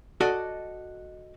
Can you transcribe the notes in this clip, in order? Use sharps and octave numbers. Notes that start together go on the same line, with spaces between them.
F#4 A4 D5 D#5